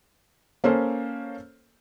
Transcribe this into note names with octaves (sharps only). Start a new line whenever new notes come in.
A#3 C#4 A4 C5